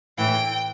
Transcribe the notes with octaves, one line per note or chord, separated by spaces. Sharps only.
A2 E3 G5